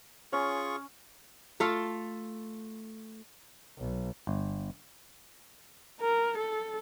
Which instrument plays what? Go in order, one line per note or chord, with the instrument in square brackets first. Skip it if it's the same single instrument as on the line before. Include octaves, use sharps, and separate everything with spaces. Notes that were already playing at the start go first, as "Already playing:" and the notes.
[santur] C#4 [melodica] F4 G#4 C#6
[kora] A3 F4 A4 F5
[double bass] B1
[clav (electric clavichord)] G1
[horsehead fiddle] A#4
A4